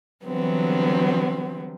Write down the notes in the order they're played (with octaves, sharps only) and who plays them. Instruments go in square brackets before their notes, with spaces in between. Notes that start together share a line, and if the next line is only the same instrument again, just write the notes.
[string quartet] D3 E3 F#3 G3 B3 C4